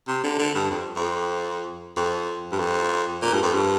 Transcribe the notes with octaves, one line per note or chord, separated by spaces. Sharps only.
C3
D3
D3
G2
F2
F2
F2
G2
F2
A#2
G2
F2
G2